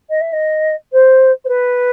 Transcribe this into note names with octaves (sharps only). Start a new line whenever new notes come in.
D#5
E5
D#5
C5
C5
B4